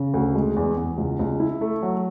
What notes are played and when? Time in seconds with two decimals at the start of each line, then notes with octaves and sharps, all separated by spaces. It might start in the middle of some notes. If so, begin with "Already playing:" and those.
Already playing: C#3
0.14 D2
0.35 G#3
0.56 E2
0.77 E2
0.98 C#2
1.19 C#2
1.40 E4
1.61 A3
1.83 F#3